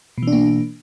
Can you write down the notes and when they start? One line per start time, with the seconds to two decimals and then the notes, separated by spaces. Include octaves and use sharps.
0.18 B2
0.23 E3
0.27 D4
0.32 A#3